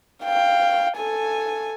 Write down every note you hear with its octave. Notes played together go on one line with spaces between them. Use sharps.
F5 G5
A4 G#5